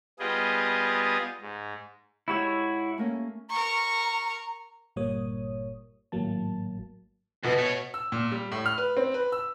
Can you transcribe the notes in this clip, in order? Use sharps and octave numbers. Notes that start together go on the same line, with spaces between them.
G3 B3 F4 G4 G#4 D#5
G#2
G#2 E4 F#4 G4 C#5 E6
A3 A#3 C#4
A#4 A#5 C#6
G1 A#2 G3 A#3 C#5 D#6
G#1 A2 F#3 A#3 A5
D2 B2 B3
A3 C#5
E6
A#2
G3
A2
F6
B4
C4
B4
E6